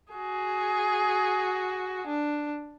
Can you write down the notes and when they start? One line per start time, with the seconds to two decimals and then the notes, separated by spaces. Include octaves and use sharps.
0.13 F#4 G#4
2.07 D4